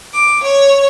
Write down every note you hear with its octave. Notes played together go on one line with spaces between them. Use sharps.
D6
C#5